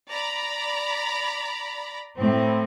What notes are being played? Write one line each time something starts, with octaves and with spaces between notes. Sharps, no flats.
D5 A#5 B5
A2 C4